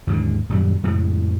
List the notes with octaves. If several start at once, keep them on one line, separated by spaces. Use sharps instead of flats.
D#2 G#2 D3 G#3
D#1 F#2 F#3 G3
F2 A2 C#3 G#3